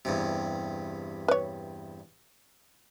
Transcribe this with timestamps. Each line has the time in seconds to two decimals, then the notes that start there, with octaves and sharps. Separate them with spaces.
0.05 E2 G2 C3
1.28 B4 C#5